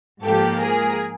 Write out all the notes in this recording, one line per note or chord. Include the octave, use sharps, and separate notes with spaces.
G#2 F3 A#3 G4 A4
G#4 A#4